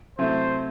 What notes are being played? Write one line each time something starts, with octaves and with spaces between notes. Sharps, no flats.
C3 F#3 A3 E4 C5